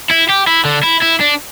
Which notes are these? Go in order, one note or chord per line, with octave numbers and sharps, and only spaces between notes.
E4
G4
E4
D3
E4
E4
D4